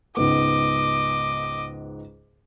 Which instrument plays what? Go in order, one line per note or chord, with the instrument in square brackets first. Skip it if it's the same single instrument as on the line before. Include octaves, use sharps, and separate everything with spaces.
[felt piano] C#2 G#2 B3 [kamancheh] D#5 D6